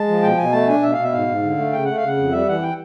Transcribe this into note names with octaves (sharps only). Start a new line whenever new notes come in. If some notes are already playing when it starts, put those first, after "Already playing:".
Already playing: G#3 A5
F3
B2 G5
B2 G#5
A3 A5
D4 G#5
B2 E5
B2 F5
E5
G#2 F5
G#2
D3
A3
C#3 G5
A3 F#5
F5
C#3 F#5
F2
G3 E5
E3 F#5
G5